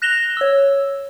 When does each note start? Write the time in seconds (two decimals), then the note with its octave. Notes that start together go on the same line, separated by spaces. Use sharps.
0.02 F#6 A#6 E7 F7 G7
0.37 C#5 E6